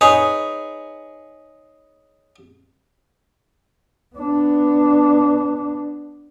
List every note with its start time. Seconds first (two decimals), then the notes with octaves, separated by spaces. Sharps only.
0.01 D#4 G#4 B4 C#5
4.16 B3 D4